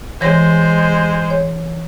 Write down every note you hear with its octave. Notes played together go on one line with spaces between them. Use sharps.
E3 G#3 C5 C#5 A#6
C#5